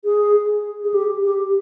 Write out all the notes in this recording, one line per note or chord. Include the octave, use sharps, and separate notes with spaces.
G#4
G#4
G4
G4